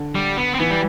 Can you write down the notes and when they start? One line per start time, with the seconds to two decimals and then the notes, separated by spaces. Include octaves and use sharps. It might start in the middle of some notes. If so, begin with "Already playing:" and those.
Already playing: D3
0.15 G3
0.37 B3
0.54 C4
0.59 E3 B3
0.70 G3